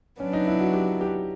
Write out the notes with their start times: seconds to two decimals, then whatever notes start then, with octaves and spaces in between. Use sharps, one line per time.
0.20 F#3 B3 C#4 D4
0.33 D#4
0.47 E4
0.60 F#4
0.74 G4
1.01 G4